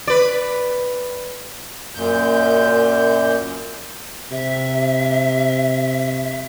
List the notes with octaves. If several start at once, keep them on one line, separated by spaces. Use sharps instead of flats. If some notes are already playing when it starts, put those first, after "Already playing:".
B4 D5
F#2 A#2 G6
C3 E5